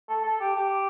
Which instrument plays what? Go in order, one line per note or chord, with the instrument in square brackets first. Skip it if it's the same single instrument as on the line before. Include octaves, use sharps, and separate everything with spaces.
[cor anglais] A4
A4
G4
G4